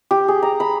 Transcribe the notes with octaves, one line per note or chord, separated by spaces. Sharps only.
G4
G#4
A#5
B5